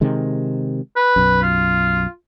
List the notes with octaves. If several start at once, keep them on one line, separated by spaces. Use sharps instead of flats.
C3 D#3 G#3
B4
B1 F#2
F4